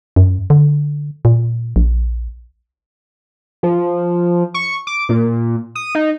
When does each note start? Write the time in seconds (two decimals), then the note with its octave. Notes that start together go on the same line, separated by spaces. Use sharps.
0.16 F#2
0.50 D3
1.25 A#2
1.76 A#1
3.63 F3
4.54 C#6
4.87 D6
5.09 A#2
5.75 D#6
5.95 D#4